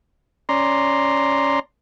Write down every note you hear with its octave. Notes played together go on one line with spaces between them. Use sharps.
C#4 D5 A#5 C6